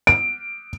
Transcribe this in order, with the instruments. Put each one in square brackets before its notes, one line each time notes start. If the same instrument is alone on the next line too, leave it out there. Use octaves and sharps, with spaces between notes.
[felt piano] D7